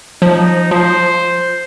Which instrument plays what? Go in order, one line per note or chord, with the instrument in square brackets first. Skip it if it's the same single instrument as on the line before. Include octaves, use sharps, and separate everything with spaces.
[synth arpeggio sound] F3 [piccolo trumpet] D#4
[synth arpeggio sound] F3 [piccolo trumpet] C5